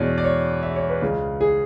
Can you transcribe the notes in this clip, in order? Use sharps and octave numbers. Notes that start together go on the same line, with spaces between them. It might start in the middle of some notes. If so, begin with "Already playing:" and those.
Already playing: E2 B2 G#3 C#5 D5
D5
C#5
E5
C#5
B4
C#2 C#3 G#3
G#4